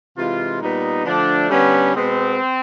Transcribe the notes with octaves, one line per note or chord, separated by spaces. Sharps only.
C3 E3 G#3 F4
A#2 G3 B3 D#4
D3 F3 A3 D4
D3 G3 B3 C#4
B2 G#3 B3 C4